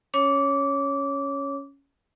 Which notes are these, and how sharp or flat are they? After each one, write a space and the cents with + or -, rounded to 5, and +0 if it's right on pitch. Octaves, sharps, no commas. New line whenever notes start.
C#4 +0 C#5 +0 D6 -20